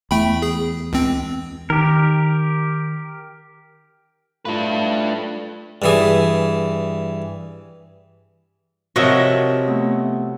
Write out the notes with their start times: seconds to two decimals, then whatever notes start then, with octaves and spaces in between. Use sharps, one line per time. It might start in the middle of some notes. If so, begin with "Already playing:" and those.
0.11 E2 A3 G5 B5
0.42 G#4
0.93 C#2 C4
1.70 D#3 G4 A#4
4.45 A2 D4 F4 B4
5.82 G2 E3 G#4
8.96 C3 F3 F#3 F#4 A#4 C#5 D#5 E5
9.68 A3 B3